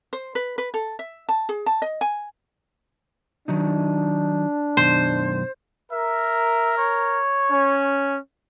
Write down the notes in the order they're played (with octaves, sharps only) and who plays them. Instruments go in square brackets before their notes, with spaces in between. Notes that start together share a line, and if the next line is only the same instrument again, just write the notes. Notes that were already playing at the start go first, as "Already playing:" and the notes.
[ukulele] C5
B4
B4
A4
E5
A5
G#4
A5
D#5
G#5
[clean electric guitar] D#3 F#3 D#4 [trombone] D4
[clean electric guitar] F#2 B2 D#3 [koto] C5
[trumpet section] A#4 [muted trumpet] E5
[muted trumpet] C#5
[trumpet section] C#4